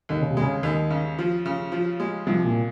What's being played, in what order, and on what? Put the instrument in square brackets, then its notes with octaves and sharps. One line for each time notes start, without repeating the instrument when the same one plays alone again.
[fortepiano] D#2 [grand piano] D#3
[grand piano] C#3
C3
[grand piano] C#3 [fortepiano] G#3
[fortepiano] D#2 [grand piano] D#3
[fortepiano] C#3
F3
C#3
F3
G#3
[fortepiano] C2 [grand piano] F3
[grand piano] A#2